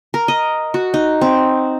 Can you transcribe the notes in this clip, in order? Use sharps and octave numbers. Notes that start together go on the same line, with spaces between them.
A#4
D#5
F#4
D#4
C4